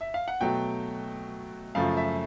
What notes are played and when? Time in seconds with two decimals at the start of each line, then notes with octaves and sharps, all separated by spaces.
0.01 E5
0.14 F5
0.28 F#5
0.41 B2 F#3 A3 G5
1.75 F#2 C#3 F3 A3 F5
1.97 E5